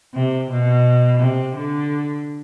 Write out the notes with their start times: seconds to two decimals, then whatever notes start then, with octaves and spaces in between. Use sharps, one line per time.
0.14 C3
0.51 B2
1.20 C3
1.55 D3